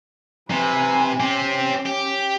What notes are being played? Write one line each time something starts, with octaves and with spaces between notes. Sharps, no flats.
C3 B4 G#5
C4 C#4 G4
G4